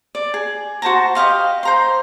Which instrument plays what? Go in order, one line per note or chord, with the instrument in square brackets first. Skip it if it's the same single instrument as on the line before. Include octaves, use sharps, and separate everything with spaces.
[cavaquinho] D5
G#4
F#4 C5 A5 A#5
G4 D#5 F5 C6
C5 A#5 C6